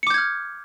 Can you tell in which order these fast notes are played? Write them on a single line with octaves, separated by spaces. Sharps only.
C#7 D6 G6 G#6 F6